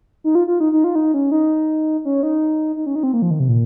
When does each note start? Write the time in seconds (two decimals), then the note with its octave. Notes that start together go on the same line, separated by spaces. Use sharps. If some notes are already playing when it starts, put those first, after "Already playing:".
0.24 D#4
0.35 F4
0.47 F4
0.60 D#4
0.73 D#4
0.84 F4
0.95 D#4
1.14 C#4
1.32 D#4
2.05 C#4
2.23 D#4
2.76 D#4
2.86 C#4
2.95 D#4
3.03 C4
3.13 A#3
3.22 F3
3.31 D#3
3.40 C3
3.49 A#2